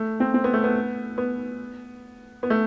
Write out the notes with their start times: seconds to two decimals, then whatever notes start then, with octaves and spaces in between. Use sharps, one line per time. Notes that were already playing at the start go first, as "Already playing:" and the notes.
Already playing: A3
0.20 C4
0.34 C4
0.44 B3
0.54 A3
0.64 B3
1.18 B3
2.43 B3
2.50 A3